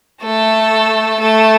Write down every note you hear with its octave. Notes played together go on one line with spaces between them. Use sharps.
A3 A4
A3 A4